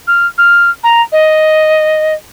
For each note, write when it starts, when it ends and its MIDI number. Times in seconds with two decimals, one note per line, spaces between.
0.08 0.27 89
0.38 0.70 89
0.84 1.02 82
1.12 2.14 75